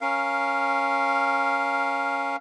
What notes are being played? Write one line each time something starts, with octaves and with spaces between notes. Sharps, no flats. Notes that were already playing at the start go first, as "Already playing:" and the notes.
C#4 A#4 F5